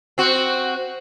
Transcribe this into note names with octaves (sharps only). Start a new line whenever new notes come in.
C4 F#4